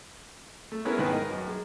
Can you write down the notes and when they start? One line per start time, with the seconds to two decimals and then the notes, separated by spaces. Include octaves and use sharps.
0.72 A3
0.85 G#3 B3 C#4 E4 A#4
0.98 G#2 D#3 B3 G#4 B4
1.13 A#4 D#5
1.30 F#2
1.48 G#3